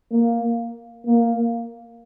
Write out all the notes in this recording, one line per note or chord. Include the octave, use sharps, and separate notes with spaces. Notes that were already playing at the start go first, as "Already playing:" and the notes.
A#3
A#3